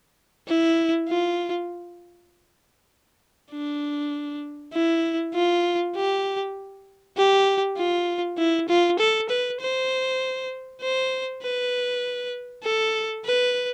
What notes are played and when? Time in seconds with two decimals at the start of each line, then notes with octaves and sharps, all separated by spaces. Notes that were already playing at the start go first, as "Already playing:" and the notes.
0.48 E4
1.09 F4
3.52 D4
4.73 E4
5.35 F4
5.96 G4
7.17 G4
7.77 F4
8.38 E4
8.69 F4
8.99 A4
9.30 B4
9.61 C5
10.82 C5
11.43 B4
12.64 A4
13.25 B4